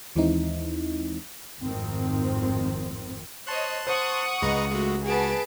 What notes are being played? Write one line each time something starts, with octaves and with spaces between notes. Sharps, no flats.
D#2 E3 G#3 C4 D#4 E4
G#1 F2 A2 D#3 C4
C5 C#5 D#5 A5 C6 F#6
C5 F#5 C#6 D#6
C#2 G#3 B4 D#5 A#5
G#3 A3 F#4
B3 F#4 G#4 B4 A5 D7